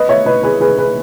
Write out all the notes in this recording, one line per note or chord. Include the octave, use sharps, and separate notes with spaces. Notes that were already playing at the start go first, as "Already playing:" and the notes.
Already playing: B4 D#5
C#5 E5
B4 D#5
G#4 B4
G#4 B4
G#4 B4